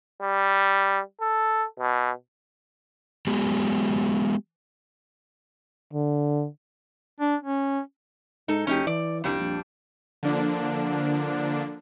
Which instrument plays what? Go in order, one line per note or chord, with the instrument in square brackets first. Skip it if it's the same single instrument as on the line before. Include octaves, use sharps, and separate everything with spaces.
[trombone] G3
A4
B2
[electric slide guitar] F#3 G#3 B3 G4
[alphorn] D3
[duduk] D4
C#4
[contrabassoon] G#2 [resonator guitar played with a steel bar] D#4 A4
[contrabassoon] F#1 [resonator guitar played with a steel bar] C#4 D#4 G4
[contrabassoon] E3 [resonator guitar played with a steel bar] D5
[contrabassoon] C2 [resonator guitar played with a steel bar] F2 G3 D4
[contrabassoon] A#1
[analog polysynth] D3 F3 A#3 D4